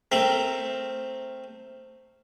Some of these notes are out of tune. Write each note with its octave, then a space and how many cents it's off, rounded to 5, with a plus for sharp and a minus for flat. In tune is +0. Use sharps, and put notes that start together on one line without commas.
A3 +10 C4 +0 A#4 -10